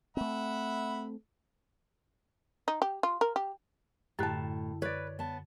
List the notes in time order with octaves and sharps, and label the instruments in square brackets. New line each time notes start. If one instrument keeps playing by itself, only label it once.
[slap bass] A3 C4 [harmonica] E5 F#5 B5
[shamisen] D#4
G4
F4
A#4
G4
[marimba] F#2 D3 [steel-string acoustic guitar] A2 [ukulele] G4 A5
[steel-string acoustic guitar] B4 [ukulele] C#5 D5
[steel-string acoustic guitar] B3 A5